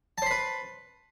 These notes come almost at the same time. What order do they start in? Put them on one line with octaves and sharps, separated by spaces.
A5 C5 B5 B4